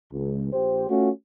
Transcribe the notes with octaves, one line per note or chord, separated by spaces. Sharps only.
C#2
A#1 G4 C5
A3 C#4 F4 F#4